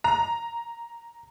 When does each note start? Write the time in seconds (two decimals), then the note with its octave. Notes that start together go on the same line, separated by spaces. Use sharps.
0.04 A#5